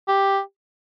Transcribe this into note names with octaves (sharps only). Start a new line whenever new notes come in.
G4